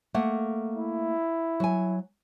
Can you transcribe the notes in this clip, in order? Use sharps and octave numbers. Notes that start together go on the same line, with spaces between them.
A3 A#3 F#5
E4
F#3 G#5